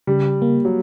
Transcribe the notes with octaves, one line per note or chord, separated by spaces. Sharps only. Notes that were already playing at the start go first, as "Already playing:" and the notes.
C#3 G3
A#3
F#3